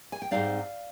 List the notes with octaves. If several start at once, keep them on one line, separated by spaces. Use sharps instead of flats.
G#5
G5
G#2 G3 C4 D#4 D5 F5